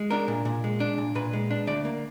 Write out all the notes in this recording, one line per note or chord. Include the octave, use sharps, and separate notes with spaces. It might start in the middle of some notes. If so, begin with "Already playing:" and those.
Already playing: G#3
D4 A#4
A#2
A#2
G#3
D4
A#2
A#2 B4
G#3
D4
D2 D5
A#3